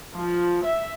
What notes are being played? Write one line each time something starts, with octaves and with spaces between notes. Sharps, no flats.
F3
E5